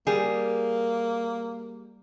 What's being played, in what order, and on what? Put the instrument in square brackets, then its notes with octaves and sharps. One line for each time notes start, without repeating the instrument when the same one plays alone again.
[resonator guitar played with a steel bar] G3 G#4 [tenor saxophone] A#3